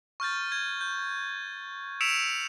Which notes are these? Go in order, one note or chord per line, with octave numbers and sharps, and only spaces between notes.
C#6 F6 G6 A6
G#6
G6
E6 B6 C#7 D7 E7 F7